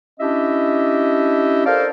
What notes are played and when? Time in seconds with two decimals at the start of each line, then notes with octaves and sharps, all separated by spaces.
0.20 C#4 D4 E4 G4 D#5 E5
1.66 A4 A#4 C5 D5 F5